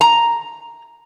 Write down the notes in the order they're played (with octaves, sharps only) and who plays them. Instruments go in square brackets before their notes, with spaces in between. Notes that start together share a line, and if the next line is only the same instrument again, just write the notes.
[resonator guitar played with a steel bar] A#5